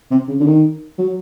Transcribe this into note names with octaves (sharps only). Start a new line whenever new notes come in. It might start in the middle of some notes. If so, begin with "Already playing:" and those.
C3
C#3
D3
D#3
F#3